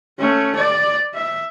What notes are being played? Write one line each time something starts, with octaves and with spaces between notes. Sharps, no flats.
A3 C#4
D5
E5